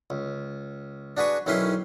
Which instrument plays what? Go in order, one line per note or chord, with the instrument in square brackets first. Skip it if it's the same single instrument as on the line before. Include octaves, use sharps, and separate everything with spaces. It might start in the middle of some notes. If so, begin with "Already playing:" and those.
[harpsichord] C#2
D4 F#4 G#4 B4 C#6
B1 D#3 C#4 E4 B4 C6